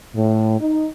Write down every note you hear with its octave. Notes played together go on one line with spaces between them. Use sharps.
A2
D#4